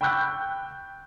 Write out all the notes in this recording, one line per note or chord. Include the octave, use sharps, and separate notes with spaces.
G5 B5 C#6 E6 F#6 G6